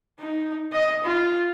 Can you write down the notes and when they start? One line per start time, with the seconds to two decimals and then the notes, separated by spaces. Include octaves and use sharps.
0.20 D#4
0.73 D#5
1.04 F4